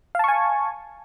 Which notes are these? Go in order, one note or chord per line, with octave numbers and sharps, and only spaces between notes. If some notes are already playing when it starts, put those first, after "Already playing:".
F5 G#5 A5 C#6